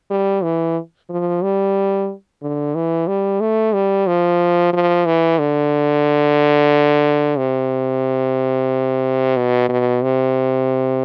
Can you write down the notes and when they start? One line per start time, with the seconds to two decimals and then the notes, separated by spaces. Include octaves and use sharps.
0.10 G3
0.43 E3
1.10 F3
1.42 G3
2.42 D3
2.75 E3
3.07 G3
3.40 A3
3.73 G3
4.07 F3
4.73 F3
5.06 E3
5.39 D3
7.37 C3
9.36 B2
9.69 B2
10.02 C3